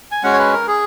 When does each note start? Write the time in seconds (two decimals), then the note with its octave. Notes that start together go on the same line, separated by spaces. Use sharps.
0.11 G#5
0.23 G#3 C#4 F#4 F#5
0.33 C#5
0.39 B4
0.53 A#4
0.68 G#4